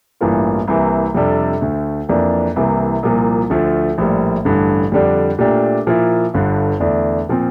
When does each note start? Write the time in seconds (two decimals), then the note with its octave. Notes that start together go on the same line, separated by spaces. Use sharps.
0.21 A1 G2 E3 A#3 F4
0.68 C2 C3 E3 A#3
1.15 F2 C3 G3 D4 A4
1.61 D2 D3 A3
2.09 F2 E3 A#3 D4
2.56 C2 C3 E3 A#3
3.03 C2 A#2 F3 A#3
3.50 D2 D3 F3 A3
3.98 A#1 A2 G3 A#3
4.45 A1 G2 D3
4.92 F2 D3 G3 D4
5.39 A#2 A3 D4 G4 A#4
5.87 A#2 F3 A#3 E4
6.34 G1 G2 D3
6.80 E2 D3 A3 D4
7.29 A#2 F3 C4